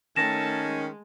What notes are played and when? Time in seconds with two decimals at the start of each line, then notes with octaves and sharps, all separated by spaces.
0.16 D#3 A3 C#4 A5 A#6 E7
0.63 G#3